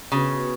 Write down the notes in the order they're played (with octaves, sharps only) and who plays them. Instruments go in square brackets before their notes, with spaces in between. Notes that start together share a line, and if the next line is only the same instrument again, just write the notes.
[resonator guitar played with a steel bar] C#3 [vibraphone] B3 F#4 B4
[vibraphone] B4